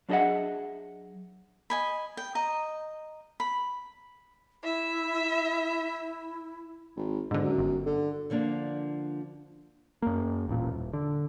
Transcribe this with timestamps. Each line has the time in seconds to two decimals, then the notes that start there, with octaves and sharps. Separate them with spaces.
0.09 F#3 D4 G#4 D#5 E5 F#5
1.70 D#5 G#5 B5
2.17 G5
2.35 D#5 A#5
3.40 B5
4.64 E4 E5
6.96 G#1
7.31 E1 G#2 D3
7.43 F#2
7.58 G1
7.86 D3
8.30 D3 F3 A#3 D4
10.02 F#2 A#3
10.47 D#1 A1 A#2
10.72 D#1
10.93 D3